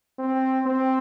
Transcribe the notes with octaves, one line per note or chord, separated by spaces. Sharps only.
C4
C4